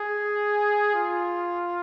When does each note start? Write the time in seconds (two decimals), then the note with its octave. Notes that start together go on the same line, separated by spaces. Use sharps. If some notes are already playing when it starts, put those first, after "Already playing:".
Already playing: G#4
0.94 F4